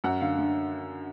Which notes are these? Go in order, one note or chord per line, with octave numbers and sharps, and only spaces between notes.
F#2 F#5
D3 F5
D3